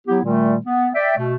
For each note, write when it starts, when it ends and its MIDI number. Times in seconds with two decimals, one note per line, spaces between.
0.07 0.20 54
0.07 0.20 59
0.07 0.20 64
0.07 0.20 67
0.24 0.56 46
0.24 0.56 51
0.24 0.56 55
0.24 0.56 57
0.66 0.89 59
0.94 1.17 74
0.94 1.17 76
0.94 1.17 79
1.17 1.36 47
1.17 1.36 57